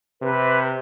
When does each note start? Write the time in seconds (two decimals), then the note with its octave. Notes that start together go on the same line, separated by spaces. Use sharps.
0.22 C3 B4